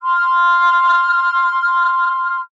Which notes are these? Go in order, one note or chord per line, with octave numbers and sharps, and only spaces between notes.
C6 F6